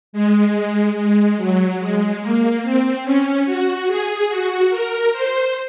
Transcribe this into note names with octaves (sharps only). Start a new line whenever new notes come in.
G#3
G#3
F#3
G#3
A#3
C4
C#4
F#4
G#4
F#4
A#4
C5